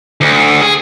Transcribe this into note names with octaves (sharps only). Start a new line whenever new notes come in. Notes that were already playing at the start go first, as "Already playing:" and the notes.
D2
G#4